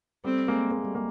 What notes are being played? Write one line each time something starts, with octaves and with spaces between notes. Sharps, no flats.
G3 A3 C4
G#3 A#3
G#3 A#3
G3 A3
G#3 A#3